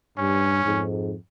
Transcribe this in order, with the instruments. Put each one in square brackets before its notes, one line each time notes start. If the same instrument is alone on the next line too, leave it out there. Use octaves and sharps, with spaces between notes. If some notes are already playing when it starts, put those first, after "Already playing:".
[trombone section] G2 [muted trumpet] C#4
[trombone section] F2 G#2